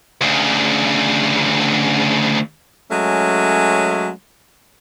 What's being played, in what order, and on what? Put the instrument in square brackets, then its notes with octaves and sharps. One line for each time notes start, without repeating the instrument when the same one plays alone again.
[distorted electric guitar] D2 C#3
[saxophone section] F#3 G#3 A3 C#4